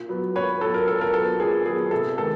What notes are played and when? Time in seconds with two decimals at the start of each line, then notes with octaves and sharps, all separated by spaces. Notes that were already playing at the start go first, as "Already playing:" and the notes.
Already playing: A#2
0.09 F#3 B3
0.35 A#2 B4 C#5
0.61 F#3 B3 A4
0.74 A#4
0.88 A#2 A4
1.01 A#4
1.13 F#3 A4
1.17 B3
1.39 A#2 G#4
1.66 F#3 B3 G#4
1.91 C3 A4
2.18 D#3 G#3 B3 A4